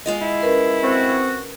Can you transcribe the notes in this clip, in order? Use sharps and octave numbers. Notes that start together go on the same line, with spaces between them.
G#3 F4 D#5
E4
C#4 A#4 B4
C4 F#4